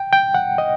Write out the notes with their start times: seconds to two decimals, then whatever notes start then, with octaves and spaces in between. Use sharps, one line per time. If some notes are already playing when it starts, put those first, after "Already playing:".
Already playing: G5
0.13 G5
0.35 F#5
0.58 D#5